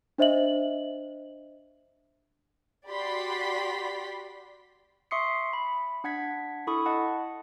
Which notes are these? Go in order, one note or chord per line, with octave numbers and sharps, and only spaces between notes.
D4 C5 D#5 E5 F#7
F#4 G4 D5 B5 C6 B6
E5 C6 C#6 D#6 C7 C#7
B5
D4 F#5 G#6 B6
E4 A4 B5 C#6 D#6
D#5 F#5 A5